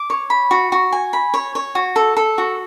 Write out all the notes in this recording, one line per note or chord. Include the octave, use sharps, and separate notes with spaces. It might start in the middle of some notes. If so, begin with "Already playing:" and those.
Already playing: D6
C#5
B5
F#4
F#4
G#5
B5
C#5
C#5
F#4
A4
A4
F#4